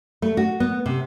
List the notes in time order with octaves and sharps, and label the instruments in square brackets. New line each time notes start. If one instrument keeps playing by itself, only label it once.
[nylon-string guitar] A3
F#4
B3
C3